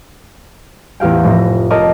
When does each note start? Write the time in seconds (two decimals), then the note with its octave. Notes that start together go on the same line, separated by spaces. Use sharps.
1.00 A1 E2 G4 F5 G5
1.24 F1 A2 A#6
1.70 A#4 C#5 D#5 A5 A#5 D6